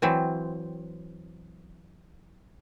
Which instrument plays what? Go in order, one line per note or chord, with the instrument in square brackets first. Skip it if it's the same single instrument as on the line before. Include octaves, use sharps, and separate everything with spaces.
[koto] E3 F#3 C4